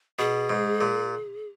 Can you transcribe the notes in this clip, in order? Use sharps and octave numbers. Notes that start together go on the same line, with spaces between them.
B2 G#4
G#2
A#2